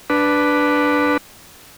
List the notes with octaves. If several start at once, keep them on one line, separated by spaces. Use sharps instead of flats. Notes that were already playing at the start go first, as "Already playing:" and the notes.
D4 B4